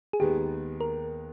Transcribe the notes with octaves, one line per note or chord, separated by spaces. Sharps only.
G#4
D#2 D#3 G#3 B3 G4
A#4